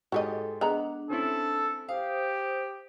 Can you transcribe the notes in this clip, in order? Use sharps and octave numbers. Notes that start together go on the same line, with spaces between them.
G#2 F#4 G4 A4 C#5 D#5
G#3 B3 D4 F#5 A#5
C4 C#4 E4 A4
G4 C5 F5 D#6